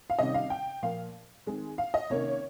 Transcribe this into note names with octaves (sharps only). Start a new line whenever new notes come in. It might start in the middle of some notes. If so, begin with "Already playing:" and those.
F5
C3 D#3 G3 C#4 D#5
F5
G5
A#2 F3 A#3 F5
D#3 G#3 C4
F5
D#5
C3 D#3 A#3 C#4 C#5